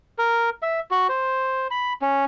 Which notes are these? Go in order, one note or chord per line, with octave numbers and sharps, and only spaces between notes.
A#4
E5
F#4
C5
B5
C#4